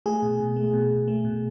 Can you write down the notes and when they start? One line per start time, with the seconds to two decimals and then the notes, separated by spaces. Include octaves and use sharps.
0.06 A3 G#4
0.23 B2
0.40 B2
0.56 A3
0.73 B2
0.90 B2
1.08 A3
1.25 B2